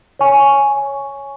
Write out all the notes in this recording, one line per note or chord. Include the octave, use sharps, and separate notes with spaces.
C#5 G#5 C#6